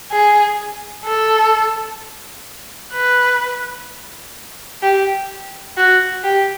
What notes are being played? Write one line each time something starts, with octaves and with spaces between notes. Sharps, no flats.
G#4
A4
B4
G4
F#4
G4